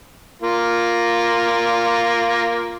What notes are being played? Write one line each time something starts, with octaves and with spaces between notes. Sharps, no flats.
A#3 F4